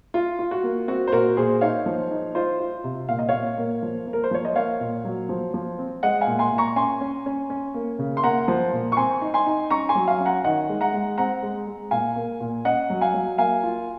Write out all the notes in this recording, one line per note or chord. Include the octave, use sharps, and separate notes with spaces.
F4
F4
F#4
A#3
C4 F#4
C5
A#2 F#4 A#4
A#2 G#4 C5
D#4 C#5 F5
F3
D#4
F4 C5 D#5
F4
C3
A#2 F5
D#5
A#2 C#5 F5
A#3
F3
A#3
A#4
C5
F3 C#5
D#5
A#3 C#5 F5
A#2
F#3
F3
F3
C4
G#3 D#5 F#5
F5 G#5
A#2
G#5 C6
A#2
A#5 C#6
C#4 G#5 C6
C#4
C#4
C#4
A#3
C#3
C6
A#3 F#5 A#5
F3
A#2
C#6
C4 G#5 C6
D#4
G#5 C6
D#4
C#4 A#5 C#6
G#5 C6
F#3
F5 G#5
C#4
F#5 A#5
D#3 D#5 F#5
G#3
F#5 A#5
G#3
C4 F#5 A#5
G#3
G#3
A#2 F5 G#5
A#3
A#2
C#4 D#5 F#5
F#3
F5 G#5
F#3
A#3 F5 G#5
F4